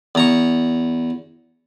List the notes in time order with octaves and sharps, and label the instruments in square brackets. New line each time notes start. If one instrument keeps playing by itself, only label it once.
[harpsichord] E2 A#5 C#6